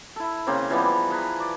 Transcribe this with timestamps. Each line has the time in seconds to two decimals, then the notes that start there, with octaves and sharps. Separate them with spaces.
0.16 E4 A4
0.47 C#3 A#3 C4
0.70 E3 F3 G3 B3
1.10 G#4 B4 A#5
1.40 D5